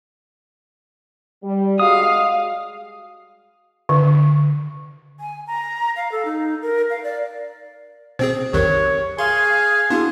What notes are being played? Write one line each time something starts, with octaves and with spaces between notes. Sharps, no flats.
G3
G#3 F#4 F5 D#6
D3
G#5
A#5
F5
A4
D#4
A#4
F5
D5
B2 C4 G#4 C5
B1 F2 D#3 G4 A#4 C#5
G#4 F5 G#5 C6
B3 D4 E4 F#4 G#4